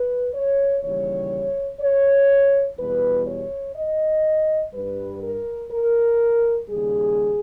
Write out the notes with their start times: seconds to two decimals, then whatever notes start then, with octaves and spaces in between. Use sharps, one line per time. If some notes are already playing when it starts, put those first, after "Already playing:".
Already playing: B4
0.34 C#5
0.83 D#2 C#3 E3 G3 C#5
1.81 C#5
2.78 E2 B2 G3 B4
3.27 C#5
3.76 D#5
4.74 G2 G3 B4
5.23 A#4
5.72 A#4
6.70 D#2 C#3 G3 G#4